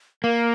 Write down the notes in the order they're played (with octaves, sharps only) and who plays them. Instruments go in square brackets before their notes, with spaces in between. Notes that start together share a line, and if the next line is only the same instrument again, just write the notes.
[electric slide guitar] A#3 [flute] A#4